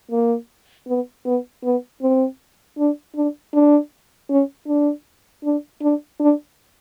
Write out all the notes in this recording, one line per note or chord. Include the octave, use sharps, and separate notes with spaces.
A#3
B3
B3
B3
C4
D4
D4
D4
C#4
D4
D4
D4
D4